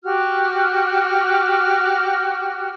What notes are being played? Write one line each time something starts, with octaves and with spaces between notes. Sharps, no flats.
F#4 G4 F6